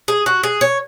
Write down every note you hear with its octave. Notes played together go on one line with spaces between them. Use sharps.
G#4
F#4
G#4
C#5